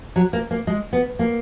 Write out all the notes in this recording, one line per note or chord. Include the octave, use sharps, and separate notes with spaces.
F#3
A#3
A#3
G#3
B3
A#3